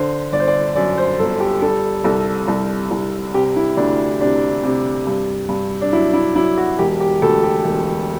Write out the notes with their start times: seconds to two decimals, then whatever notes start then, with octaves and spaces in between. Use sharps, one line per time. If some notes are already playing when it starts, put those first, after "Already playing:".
Already playing: D3 C5
0.32 G1 D5
0.40 C5
0.47 D5
0.75 F#2 D5
0.98 C5
1.19 G1 A4
1.40 G4
1.62 G3 A4
2.04 C2 A4
2.48 C2
2.91 C2
3.34 C3 G4
3.56 E4
3.77 D2 D4
4.21 C3 D4
4.63 C3
5.07 G2
5.49 G2
5.81 D4
5.93 F#3 E4
6.13 E4
6.35 F#3 E4
6.57 F#4
6.79 E1 G4
7.00 G4
7.22 D2 A4
7.43 G4
7.65 E1